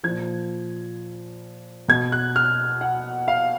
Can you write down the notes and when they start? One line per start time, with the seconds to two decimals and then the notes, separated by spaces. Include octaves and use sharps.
0.04 A#2 F3 G#6
1.88 B2 G#6
2.12 F#6
2.36 F6
2.81 F#5
3.28 F5